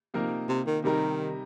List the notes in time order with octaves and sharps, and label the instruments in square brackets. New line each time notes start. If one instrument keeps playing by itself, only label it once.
[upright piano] C3 F3 A#3 D#4 A#4
[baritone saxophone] C3
D#3
[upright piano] C3 G3 D#4 A#4 [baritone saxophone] D#3